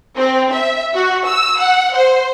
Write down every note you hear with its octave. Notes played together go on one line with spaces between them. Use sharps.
C4
E5
F#4
E6
F#5
C5